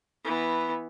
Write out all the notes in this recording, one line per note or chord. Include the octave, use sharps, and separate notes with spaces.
E3 B3